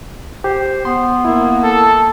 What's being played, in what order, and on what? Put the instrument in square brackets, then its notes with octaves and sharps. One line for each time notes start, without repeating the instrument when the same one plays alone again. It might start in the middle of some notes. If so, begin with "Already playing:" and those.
[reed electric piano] G4 [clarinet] C5
[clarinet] B3 [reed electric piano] C6
[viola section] A#3 [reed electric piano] E4 E5
[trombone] A4